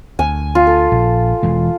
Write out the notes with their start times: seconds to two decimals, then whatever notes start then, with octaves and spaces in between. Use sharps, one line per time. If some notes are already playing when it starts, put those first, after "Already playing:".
0.19 D2 G#5
0.55 F4
0.67 A4
0.92 A#1
1.43 E1 E3 G#3